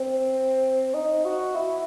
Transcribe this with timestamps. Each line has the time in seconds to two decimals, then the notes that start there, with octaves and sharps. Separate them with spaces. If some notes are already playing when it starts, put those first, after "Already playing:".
Already playing: C4
0.94 D#4
1.25 F#4
1.55 E4